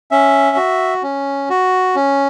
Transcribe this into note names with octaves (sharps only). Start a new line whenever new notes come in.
C#4 E5
F#4
C#4
F#4
C#4